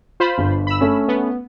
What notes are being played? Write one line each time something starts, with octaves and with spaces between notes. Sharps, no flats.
F4 C5 B5
G1
B5 E6
A3 C#4
B3